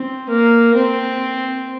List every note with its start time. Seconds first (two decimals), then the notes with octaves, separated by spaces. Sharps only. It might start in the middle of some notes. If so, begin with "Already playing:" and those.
Already playing: C4
0.29 A#3
0.75 C4